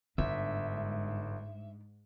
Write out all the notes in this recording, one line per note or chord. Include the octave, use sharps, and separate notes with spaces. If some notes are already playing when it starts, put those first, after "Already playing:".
G1 G#2 D4 E5